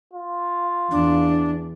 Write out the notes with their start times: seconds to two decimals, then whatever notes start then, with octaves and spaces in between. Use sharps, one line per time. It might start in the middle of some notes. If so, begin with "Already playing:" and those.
0.13 F4
0.91 E2 D4